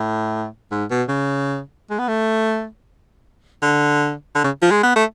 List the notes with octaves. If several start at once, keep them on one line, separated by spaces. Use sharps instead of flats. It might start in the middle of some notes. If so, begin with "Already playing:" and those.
Already playing: A2
G#2
B2
C#3
G#3
B3
A3
D3
D3
C#3
F3
G#3
B3
A3